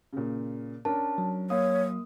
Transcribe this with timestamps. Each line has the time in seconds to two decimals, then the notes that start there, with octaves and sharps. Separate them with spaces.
0.13 A#2 C#3
0.85 C#4 D4 A#4 A5
1.18 F#3
1.50 A#3 C#5 F5 D#6